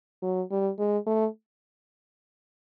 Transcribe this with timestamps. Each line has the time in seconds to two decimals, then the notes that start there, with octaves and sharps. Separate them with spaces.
0.22 F#3
0.51 G3
0.78 G#3
1.07 A3